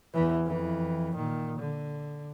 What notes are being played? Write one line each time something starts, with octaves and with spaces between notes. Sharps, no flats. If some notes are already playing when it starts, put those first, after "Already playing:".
E2 E3
F2 E3
A#2 D#3
D3